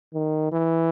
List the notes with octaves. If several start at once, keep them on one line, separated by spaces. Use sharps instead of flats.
D#3
E3